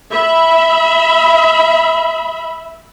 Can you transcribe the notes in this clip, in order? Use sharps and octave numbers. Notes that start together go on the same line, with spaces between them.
E5 B5